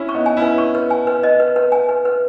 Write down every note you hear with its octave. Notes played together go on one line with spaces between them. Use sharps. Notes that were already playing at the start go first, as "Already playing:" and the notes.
Already playing: C#4 E4
C#6
B3 D#4
G#5
C#4 E4 B4
C#6
B4
G#5
B4
D#5
B4
B4
G#5
B4
B4